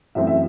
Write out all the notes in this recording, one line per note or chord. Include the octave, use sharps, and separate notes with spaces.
F#2 E3 A3 C4 E5
E5